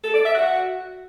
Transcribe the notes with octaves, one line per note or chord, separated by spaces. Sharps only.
A4
D5
E5
F#4